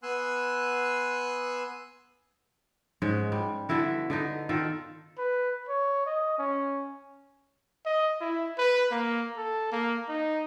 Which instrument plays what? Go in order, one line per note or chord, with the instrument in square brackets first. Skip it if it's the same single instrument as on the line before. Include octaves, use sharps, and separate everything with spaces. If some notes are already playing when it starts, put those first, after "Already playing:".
[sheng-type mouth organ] B3 G#5 C6 E6 F#6
[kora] G#2 G#3 C#4
G3
D3 B3 E4 F#4
D3 B3 D#4
D#3 F4 A4
[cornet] B4
C#5
D#5
C#4
[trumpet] D#5
E4
B4
A#3
A4
A#3
D#4